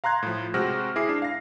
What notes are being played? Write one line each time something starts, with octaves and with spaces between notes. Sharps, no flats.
F5 A#5 C6 F#6 G#6
A2 F3
C3 G#3 C4 F#4 F6 A#6
E4 G#4 D6 C7
D4
F5 A#6